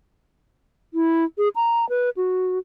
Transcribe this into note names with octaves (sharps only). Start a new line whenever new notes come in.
E4
G#4
A#5
B4
F#4